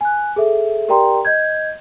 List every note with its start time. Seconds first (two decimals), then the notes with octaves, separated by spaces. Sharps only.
0.01 G#5 F#6
0.36 G#4 A4 E5
0.89 G4 A#4 D5 G5 A#5 C6
1.25 D#5 G6 G#6